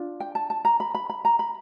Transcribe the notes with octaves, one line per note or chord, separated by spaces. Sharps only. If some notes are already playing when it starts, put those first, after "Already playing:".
Already playing: D4 F4
G5
A5
A5
A#5
B5
B5
B5
A#5
B5